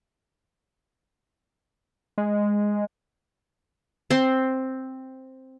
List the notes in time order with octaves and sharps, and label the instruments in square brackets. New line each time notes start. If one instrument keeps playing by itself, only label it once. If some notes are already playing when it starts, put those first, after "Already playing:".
[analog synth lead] G#3
[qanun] C4 C6